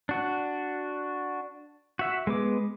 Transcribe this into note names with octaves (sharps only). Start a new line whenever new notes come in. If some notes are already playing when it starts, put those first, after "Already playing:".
D4 F#4
F#4 E5
G#3 B3 D6